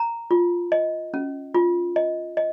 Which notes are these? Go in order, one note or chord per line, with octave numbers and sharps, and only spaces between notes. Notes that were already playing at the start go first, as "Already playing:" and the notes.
Already playing: A#5
F4
D#5
C#4
F4
D#5
D#5